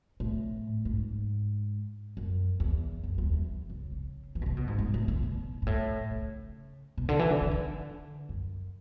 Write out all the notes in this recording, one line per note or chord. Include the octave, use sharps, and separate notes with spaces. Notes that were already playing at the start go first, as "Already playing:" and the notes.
A2
G#2
F#2
E2
F#2
E2
E2
C#3
C#3
E3
B2
C#3
B2
G#2
G#2
A2
D3
B2
G#2
A2
C#3
B2
D3
E3
D3
E3
D3
F#2